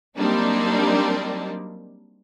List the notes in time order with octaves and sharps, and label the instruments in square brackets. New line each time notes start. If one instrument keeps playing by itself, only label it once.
[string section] F#3 G3 A#3 C4 D4 D#4